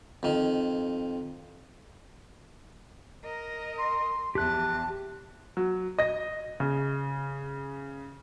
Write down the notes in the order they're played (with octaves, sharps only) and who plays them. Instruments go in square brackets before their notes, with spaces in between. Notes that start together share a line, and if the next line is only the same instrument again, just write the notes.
[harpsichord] F2 D#3
[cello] A#4 D#5
[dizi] C6
[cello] E2 F3 [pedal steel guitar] G4 F#6 [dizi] A5
[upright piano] F#3
D#5 A#6
C#3